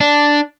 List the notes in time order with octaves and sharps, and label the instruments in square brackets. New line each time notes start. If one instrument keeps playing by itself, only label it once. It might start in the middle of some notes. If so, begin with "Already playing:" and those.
[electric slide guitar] D4